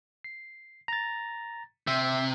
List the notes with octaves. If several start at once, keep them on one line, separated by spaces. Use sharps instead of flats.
C7
A#5 A6
C3 E5